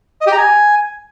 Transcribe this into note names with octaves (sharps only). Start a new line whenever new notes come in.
D#5
G4
A#5
G#5